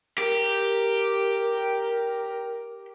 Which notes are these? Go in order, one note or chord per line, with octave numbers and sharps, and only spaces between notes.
G4 A#4